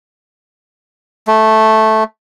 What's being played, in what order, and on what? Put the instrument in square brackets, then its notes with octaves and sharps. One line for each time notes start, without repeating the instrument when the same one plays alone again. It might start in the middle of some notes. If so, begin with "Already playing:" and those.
[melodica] A3